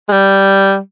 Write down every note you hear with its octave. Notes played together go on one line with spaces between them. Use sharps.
G#3
G3